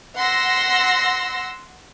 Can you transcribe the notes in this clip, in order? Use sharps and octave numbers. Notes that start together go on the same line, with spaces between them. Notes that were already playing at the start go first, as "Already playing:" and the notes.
F#5 C6 E6 A#6